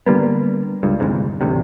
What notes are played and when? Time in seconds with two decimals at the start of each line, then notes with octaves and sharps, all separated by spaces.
0.06 D3 G3 A#3 B3
0.83 C#2 G2
1.00 G1 C2 F2 G#2
1.41 A1 D2 C3